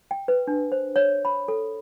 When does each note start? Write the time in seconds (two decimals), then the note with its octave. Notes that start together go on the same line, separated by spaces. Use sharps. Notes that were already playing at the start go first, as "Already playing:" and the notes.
0.11 G5
0.28 B4
0.47 D4
0.72 C5
0.96 C#5
1.25 B5
1.48 A4